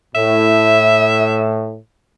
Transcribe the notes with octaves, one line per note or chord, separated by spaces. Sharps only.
A2 E5